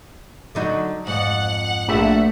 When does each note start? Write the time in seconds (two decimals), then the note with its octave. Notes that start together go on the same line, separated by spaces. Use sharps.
0.55 D3 F#3 D#4
1.07 F2 G#2 F#5
1.88 A#1 A3 E5